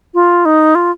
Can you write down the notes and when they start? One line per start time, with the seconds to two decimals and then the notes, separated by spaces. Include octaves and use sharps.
0.14 F4
0.45 D#4
0.75 F4